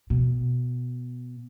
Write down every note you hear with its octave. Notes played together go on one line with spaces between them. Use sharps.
B2